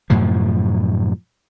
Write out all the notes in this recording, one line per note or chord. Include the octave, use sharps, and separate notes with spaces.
F#2 A2 C3 F3